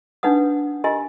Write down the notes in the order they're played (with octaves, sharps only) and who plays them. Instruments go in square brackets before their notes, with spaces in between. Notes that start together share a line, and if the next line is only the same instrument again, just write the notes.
[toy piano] D4 D#4 B4 F#5 D#6
F4 G4 A#4 D#5 G#5 C6